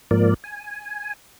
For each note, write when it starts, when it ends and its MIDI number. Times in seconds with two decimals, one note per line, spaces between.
0.11 0.34 44
0.11 0.34 53
0.11 0.34 58
0.11 0.34 70
0.11 0.34 74
0.44 1.13 80